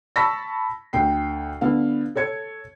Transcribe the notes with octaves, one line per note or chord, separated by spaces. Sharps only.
A5 B5 C#6 E6 A#6 B6
D2 G5 C7
D3 B3 F5
A4 C#5 G#6 C#7